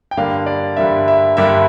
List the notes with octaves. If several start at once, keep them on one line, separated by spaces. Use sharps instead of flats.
G5
G2 D3 G3 A#3 D4 F5
D5
G2 D3 G3 A#3 D4 E5
E5
G2 D3 G3 A#3 D4 E5